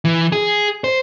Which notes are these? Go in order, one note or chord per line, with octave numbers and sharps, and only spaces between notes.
E3
G#4
C5